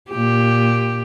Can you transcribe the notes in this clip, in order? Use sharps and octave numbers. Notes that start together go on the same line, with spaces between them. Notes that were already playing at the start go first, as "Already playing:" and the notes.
A#2 G4